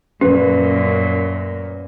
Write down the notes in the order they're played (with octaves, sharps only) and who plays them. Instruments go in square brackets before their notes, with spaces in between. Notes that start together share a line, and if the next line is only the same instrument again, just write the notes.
[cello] F#2 A#2 [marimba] C#4 [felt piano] B4